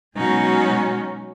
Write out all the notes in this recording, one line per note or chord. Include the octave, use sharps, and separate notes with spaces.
B2 F#3 G#3 C#4 D#4 F#4